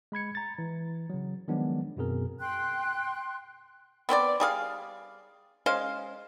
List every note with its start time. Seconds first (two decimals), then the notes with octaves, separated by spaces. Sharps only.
0.12 G#3 B5 G#6 C#7
0.35 A#5 A6
0.58 E3
1.10 C#3 F#3
1.48 D#3 F3 F#3 G#3 B3 D4
1.97 F#2 B2 C4 G#4 A#4
2.40 G5 C6 F#6
4.09 B3 C4 C5 D5
4.40 G3 G#4 F5
5.66 G#3 C#4 C5 F5